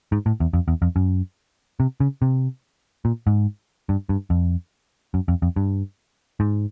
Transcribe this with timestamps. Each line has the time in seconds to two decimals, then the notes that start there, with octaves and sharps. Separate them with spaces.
0.12 G#2
0.26 A2
0.40 E2
0.53 F2
0.68 E2
0.82 F2
0.96 F#2
1.80 C3
2.00 C#3
2.22 C3
3.05 A#2
3.27 G#2
3.89 G2
4.09 G2
4.30 F2
5.14 F#2
5.28 F2
5.42 F2
5.56 G2
6.40 G#2